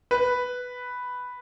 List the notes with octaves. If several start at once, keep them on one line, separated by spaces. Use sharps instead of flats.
B4